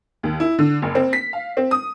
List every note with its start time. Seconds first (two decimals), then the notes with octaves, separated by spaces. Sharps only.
0.23 D#2
0.40 E4
0.59 D3
0.82 F#1
0.95 C4
1.13 B6
1.33 F5
1.57 C4
1.71 D#6